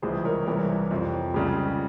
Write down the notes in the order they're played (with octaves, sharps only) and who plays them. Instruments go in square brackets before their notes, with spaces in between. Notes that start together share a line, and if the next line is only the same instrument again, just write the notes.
[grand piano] C#2 C3 E3 G3 G#4 C5
A#4 C#5
C2 C3 E3 G3 A#4 C#5
F2 C3 F3
C#2 C#3 G3